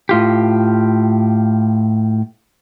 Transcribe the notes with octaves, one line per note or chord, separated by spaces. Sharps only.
A2 F4 G4